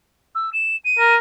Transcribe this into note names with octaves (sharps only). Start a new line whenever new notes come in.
E6
E7
D#7
A#4